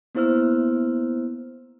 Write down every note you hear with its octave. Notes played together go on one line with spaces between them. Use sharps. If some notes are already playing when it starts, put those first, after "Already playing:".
A#3 B3 E4 C5 E6 F6